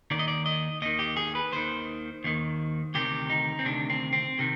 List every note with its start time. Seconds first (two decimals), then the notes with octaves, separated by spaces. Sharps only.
0.11 D#2 D#3 D5
0.19 D#5
0.28 D5
0.46 D#5
0.82 D#2 D#3 D#5
0.99 G4
1.17 G#4
1.35 B4
1.52 D#2 D#3 C5
2.24 D#2 D#3
2.94 D2 C3 D#3 G4
3.30 D#4
3.59 C4
3.65 D2 C3 D#3 D4
3.90 C4
4.13 C4
4.39 C3 D#3